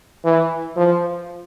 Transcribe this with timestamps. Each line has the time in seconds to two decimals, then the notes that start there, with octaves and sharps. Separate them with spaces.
0.24 E3
0.77 F3